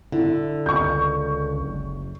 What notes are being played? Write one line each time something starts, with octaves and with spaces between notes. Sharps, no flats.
D3 E4
C#2 C#6 G6
F#1